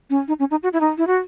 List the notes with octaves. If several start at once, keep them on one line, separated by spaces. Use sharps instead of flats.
C#4
D#4
C#4
D#4
F#4
E4
D#4
E4
F#4